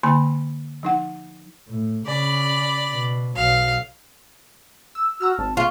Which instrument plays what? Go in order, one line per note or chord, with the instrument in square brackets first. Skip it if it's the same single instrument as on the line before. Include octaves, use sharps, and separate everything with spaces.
[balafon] D3 A#3 G#5 B5
F3 D#4 F#5
[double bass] A2
[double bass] C#3 [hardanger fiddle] D5 B5
[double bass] B2
[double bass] B1 F#3 [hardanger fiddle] F5
[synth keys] E6
[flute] F#4 [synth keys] A#5 E6 F6
[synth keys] G#1 [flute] A5
[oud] F4 [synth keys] G#4 [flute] C#6